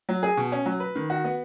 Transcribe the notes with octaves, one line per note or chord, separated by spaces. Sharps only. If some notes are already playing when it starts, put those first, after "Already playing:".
F#3
G#4
B2
C#4
F#3
B4
D#3
F#4
B3